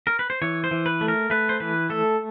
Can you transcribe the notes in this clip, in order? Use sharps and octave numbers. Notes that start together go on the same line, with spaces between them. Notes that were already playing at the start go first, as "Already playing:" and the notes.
A#4
B4
C5
E3 C#5
C5
E3
B4
A3
A#4
A3 B4
C5
E3 B4
A3 A4